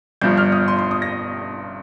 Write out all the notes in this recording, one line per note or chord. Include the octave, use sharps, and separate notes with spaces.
G1 G2 F3 G6
F6
D#6
C6
C6
D#6
A#6